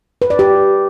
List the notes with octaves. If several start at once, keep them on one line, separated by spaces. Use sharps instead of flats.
B4
D5
G4